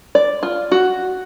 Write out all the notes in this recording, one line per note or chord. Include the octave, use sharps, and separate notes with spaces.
D5
F4
F#4